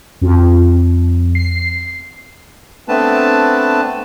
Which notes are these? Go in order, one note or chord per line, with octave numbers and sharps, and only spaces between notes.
F2
C7
A3 B3 C4 D4 B4 A5